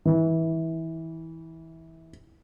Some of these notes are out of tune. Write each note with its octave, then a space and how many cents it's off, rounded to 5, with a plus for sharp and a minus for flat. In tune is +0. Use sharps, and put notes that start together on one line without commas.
E3 -20